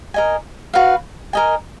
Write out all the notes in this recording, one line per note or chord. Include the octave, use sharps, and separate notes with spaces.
A#4 D#5 G#5
F#4 B4 F5
A#4 D#5 G#5